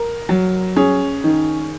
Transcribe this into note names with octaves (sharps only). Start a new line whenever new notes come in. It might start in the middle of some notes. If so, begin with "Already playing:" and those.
Already playing: A#4
F#3
C#4 G#4
D#3